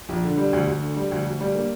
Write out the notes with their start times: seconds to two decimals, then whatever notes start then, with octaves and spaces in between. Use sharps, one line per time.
0.09 A#1
0.23 D3
0.37 G3
0.53 D2
0.67 D2
0.82 D3
0.97 G3
1.11 D2
1.26 D2
1.41 G3
1.55 A#3